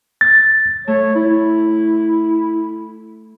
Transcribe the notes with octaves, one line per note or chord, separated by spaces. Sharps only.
A6
A3 C#5
E4